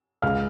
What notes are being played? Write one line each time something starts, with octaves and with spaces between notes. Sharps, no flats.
C#2 F5 F6